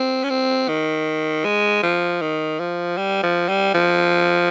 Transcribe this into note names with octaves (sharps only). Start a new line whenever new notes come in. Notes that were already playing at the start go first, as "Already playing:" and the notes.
Already playing: C4
C#4
C4
D#3
G#3
F3
D#3
F3
G3
F3
G3
F3